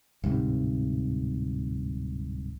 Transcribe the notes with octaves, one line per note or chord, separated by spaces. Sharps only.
D1 C2 G#2 C3